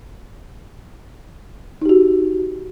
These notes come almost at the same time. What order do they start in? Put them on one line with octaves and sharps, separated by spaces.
D#4 G4 F#4